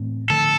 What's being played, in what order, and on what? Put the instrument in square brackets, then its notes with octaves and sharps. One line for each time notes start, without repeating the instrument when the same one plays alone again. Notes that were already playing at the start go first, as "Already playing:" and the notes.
Already playing: [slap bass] A2 E3 A3 C4
[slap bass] D3 F3 A3 [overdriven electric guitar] A4